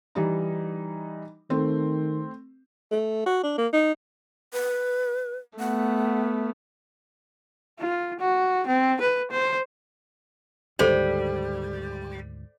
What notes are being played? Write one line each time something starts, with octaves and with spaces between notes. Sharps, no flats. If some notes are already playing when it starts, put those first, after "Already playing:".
E3 G3 D#4
D#3 A3 C4
A3
F#4
D4
A#3
D#4
B4
A3 B3 F#5
F4
F#4
C4
B4
C5
D2 G#2 D#3 G3 A4 C5 D5